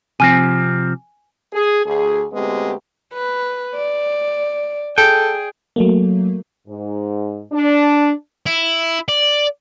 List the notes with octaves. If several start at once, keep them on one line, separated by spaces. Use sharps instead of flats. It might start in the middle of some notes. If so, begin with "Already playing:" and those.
C3 F3 C4 G#5
G#4
D2 G#4
D2 G#3 B3 C4 G4
B4
D5
G#4 A4 G5
F#3 A3 A#3
G#2
D4
E4
D5